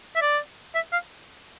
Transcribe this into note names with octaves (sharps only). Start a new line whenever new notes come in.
E5
D5
E5
F5